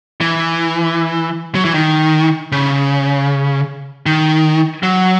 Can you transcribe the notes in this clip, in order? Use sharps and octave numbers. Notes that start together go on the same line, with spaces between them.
E3
F#3
E3
D#3
C#3
D#3
F#3